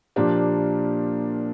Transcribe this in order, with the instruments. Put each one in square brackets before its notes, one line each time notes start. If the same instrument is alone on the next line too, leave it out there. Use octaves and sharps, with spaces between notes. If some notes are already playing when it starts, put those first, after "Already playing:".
[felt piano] A#2 F3 A#3 D4 G4